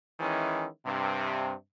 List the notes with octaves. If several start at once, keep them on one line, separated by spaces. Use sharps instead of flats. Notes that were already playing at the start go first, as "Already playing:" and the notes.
D#3 E3 G#3 C#4 E4
G2 C3